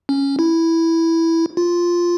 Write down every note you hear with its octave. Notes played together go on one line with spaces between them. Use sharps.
C#4
E4
F4